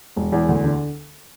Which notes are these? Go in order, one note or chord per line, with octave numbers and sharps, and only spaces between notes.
E1
E2
D2
D3